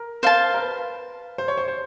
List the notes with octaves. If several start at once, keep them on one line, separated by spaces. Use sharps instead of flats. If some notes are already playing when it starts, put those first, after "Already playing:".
Already playing: A#4
C5 F5 A5
A#4
B4
C5
C#5
C5
C5